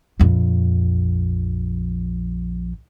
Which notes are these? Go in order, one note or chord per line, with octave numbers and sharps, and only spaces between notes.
A#1 F2